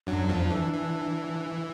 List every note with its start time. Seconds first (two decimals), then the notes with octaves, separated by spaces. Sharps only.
0.07 F#2 F#3 D4
0.29 F2 F3
0.50 E3
0.73 E3